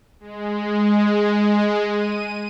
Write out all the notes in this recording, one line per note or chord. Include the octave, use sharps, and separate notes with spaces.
G#3
D#7